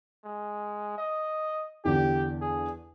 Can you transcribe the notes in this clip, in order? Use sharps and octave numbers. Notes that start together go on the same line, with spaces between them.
G#3
D#5
E2 D3 G4
G#4